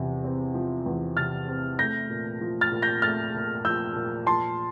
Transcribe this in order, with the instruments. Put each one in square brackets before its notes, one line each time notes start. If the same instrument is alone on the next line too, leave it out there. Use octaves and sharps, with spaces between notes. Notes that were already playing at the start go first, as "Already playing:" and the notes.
Already playing: [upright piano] E2 C3 F3
C4
F3
E2
C3 F6 A6
C4
A3 G6 A#6
A#2
F3
F6 A6
A#2
G6 A#6
A3 F6 A6
A#2
F3 E6 G6
A#2
F3 A5 C6